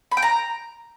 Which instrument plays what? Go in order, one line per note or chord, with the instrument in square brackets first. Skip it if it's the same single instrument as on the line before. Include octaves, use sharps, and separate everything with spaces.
[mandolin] B5
G5
A#5